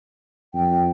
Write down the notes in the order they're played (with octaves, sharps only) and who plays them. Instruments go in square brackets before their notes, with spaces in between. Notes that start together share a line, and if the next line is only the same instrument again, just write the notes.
[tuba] F2 [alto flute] G5